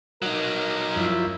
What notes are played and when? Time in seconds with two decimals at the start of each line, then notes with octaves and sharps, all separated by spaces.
0.22 F#3 D#4 A#4
0.96 F#2 F3 E4